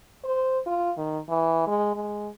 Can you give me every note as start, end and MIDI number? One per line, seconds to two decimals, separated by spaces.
0.24 0.59 72
0.66 0.92 65
0.97 1.19 51
1.29 1.65 52
1.67 1.92 56
1.96 2.29 56